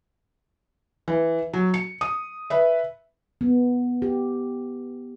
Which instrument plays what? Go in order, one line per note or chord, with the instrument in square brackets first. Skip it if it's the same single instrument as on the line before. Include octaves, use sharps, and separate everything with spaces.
[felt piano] E3
F#3
C#7
D#6
B4 E5
[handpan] B3
G4